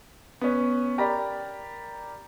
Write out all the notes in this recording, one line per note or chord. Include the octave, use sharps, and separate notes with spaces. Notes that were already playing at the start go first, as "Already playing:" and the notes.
B3 C#4
G4 A#4 D5 A#5 B5